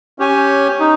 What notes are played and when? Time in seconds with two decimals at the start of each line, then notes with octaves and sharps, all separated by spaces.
0.19 C#4 G4 C#5 G#5
0.80 D#4